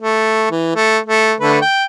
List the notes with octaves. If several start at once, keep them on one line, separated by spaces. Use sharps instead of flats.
A3
E3
A3
A3
D3 A3 B4
G5